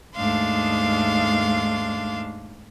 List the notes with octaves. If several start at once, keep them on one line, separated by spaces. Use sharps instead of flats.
D#2 G#2 A3 D4 F5 C6